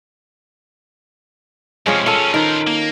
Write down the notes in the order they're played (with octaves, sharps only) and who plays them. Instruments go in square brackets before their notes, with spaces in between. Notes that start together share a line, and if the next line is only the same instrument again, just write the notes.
[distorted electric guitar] F2 C3 [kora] G#3 C#4 F4
[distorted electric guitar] A#2 C#4 [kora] F4 A4
[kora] D#3 [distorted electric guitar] A#4 C5
[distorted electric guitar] A#3